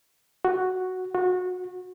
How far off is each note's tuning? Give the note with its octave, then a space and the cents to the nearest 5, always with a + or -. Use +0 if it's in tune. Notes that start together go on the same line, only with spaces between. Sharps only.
F#4 +0
F#4 -25